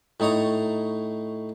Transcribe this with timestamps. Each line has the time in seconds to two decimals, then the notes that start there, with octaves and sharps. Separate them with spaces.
0.20 A2 D#4 C#5 A#5